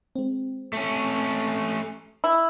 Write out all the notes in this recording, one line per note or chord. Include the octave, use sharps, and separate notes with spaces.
G#3 C4
A3 C#4
E4